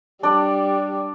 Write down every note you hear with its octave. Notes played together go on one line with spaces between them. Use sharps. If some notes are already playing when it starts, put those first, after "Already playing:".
G3 D4 D5